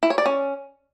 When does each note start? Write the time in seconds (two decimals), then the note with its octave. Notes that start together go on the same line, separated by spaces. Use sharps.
0.03 E4
0.10 C#5
0.18 D5
0.26 C#4